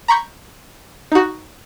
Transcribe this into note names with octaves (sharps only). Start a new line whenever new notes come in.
A#5 B5 C#6 G6
D#4 F#4